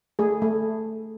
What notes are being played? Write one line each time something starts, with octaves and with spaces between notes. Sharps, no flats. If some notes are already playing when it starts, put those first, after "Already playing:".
A3 G#4
A3